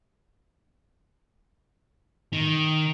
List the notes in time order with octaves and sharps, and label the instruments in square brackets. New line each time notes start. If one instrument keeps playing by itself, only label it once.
[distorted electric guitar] D#3